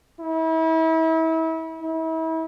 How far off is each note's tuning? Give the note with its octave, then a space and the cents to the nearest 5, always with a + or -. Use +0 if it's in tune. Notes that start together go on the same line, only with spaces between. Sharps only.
E4 -35
E4 -35